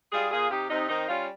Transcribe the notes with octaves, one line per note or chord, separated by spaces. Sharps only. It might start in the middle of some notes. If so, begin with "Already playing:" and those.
G3 F4 G#4
A#2 F4 G#4
C3 D#4 G4
C3 C4 D#4
D#3 C4 D#4
G3 C#4 F4